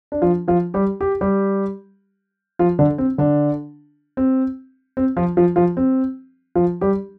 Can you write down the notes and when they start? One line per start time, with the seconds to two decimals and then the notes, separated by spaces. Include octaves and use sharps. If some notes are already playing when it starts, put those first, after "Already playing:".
0.12 D4
0.22 F3 F4
0.48 F3 F4
0.74 G3 G4
1.01 G4
1.21 G3 G4
2.59 F3 F4
2.79 D3 D4
2.98 C4
3.18 D3 D4
4.17 C4
4.97 C4
5.17 F3 F4
5.37 F3 F4
5.56 F3 F4
5.77 C4
6.55 F3 F4
6.81 G3 G4